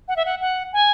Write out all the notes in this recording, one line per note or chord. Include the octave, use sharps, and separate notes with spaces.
F#5
E5
F#5
F#5
G#5